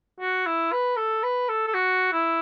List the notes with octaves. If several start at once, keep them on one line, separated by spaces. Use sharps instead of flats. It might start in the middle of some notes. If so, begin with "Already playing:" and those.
F#4
E4
B4
A4
B4
A4
A4
F#4
E4